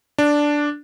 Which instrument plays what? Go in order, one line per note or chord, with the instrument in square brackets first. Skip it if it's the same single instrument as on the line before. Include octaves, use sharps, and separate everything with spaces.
[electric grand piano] D4